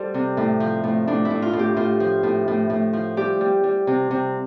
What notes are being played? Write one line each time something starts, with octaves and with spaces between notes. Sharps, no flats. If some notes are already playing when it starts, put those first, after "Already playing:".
Already playing: G3 A4 C5 D5
C3
A2
F3
A2
A2 D4
E4
A2
F4
A2
G4
A2 F4
F3
A2
A2
A2
F3
G3 G4
G3
G3
C3
C3